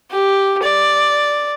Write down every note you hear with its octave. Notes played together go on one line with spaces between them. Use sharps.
G4
D5